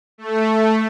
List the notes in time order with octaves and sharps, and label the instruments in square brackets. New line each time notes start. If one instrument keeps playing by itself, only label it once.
[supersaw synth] A3